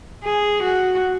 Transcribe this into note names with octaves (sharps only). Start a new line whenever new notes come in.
G#4
F#4